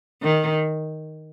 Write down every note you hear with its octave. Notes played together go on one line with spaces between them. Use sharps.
D#3